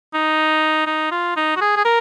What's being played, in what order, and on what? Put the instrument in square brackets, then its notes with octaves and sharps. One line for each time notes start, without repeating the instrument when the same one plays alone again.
[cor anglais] D#4
D#4
F4
D#4
F#4
G#4
G#4
A#4